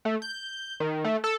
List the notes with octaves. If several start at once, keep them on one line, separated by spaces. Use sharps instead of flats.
A3
G6
D#3
A3
A4